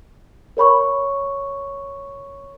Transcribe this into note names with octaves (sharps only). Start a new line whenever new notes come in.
A#4 C#5 B5 C#6